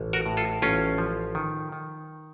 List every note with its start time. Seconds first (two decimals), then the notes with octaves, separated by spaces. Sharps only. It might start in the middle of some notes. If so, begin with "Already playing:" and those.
Already playing: A1
0.13 F#4 A#4
0.26 A2
0.37 F4 A4
0.62 A1 C#4 F4
0.98 F3
1.35 D#3
1.72 D#3